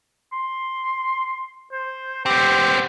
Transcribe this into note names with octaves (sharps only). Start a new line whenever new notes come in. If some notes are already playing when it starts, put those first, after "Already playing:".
C6
C5
B3 C4 G4